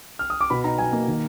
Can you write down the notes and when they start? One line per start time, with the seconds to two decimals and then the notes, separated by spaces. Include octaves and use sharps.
0.19 F6
0.30 D#6
0.41 D6
0.50 B2 B5
0.64 D#4 A#5
0.78 F#3 G#5
0.93 A#3
1.07 D#3